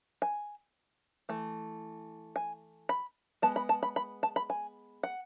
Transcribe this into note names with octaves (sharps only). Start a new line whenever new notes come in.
G#5
E3 A3
G#5
B5
G#3 B3 A5
B5
A5
B5
B5
A5
B5
G#5
F#5